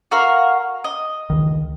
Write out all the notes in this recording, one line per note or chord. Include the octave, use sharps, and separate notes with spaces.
F#4 A#4 F5
D#5
C#2 D#3